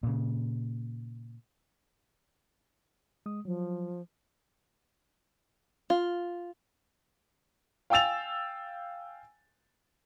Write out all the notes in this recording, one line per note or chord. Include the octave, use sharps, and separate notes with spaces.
A#2 C#3
G#3 D#6
F3 F#3
F4
F5 G5 G#5 E6 A6 F7